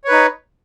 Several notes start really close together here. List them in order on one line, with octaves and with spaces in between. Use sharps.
C#5 B4 D#4